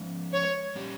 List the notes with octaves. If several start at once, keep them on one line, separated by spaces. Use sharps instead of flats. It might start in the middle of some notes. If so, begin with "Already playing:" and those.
Already playing: F3 G#3 C#4 G#4
C#5
A#2 G3 C#4 G4